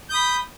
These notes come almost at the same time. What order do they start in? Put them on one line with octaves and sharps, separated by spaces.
G6 D#6 B5